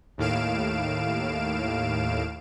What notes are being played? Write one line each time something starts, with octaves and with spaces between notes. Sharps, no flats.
D#2 A2 F5 D7 E7